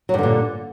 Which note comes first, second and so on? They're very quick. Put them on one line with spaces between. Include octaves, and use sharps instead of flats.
F#3 G2 D3 A#2